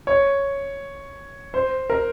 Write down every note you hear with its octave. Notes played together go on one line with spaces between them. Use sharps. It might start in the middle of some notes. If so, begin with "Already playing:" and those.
C#5
C5
A#4